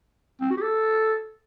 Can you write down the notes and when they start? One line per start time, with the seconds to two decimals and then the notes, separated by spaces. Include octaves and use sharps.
0.41 C4
0.51 F#4
0.57 G4
0.62 A4